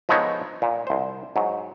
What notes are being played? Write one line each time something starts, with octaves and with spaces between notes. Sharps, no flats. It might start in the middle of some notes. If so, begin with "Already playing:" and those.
F3 G#3 B3 D#4 A4 C#5
A#2
C2 C5
G#2 F#3